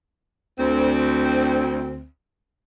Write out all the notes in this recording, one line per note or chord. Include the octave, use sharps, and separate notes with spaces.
D2 C4